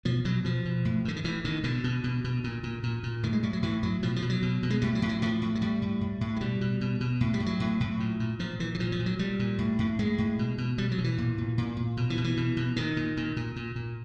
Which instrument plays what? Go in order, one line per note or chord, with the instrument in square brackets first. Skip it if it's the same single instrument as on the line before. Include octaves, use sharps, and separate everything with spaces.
[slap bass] B2 F3
B2 F#3
B2 F3
B2
A2
A2 D3
D#3
A2 E3
A2 D#3
B2 D3
B2
B2
B2
A#2
A#2
A#2
A#2
A2 D#3
G#3
A2 G3
F#3
A2 E3
A2 F#3
B2 F3
F3
B2
F#3
B2
B2
G#3
A2 G3
F#3
A2
F#3
A2 F3
A2
F#3
A2 G3
A2
A2
A2
G#3
B2 G3
B2
B2
B2
A2
G3
A2
F#3
A2
A2
A#2
A#2
A#2 F3
A#2 E3
E3
A#2 F3
F3
A#2
F#3
A#2 G3
A#2
A2
A2
A2 G#3
A2
B2
B2
B2 G3
F#3
B2
E3
A#2
A#2
A#2
A#2
B2
E3
B2
E3
B2
B2
A#2 D#3
A#2
A#2
A#2
A#2
A#2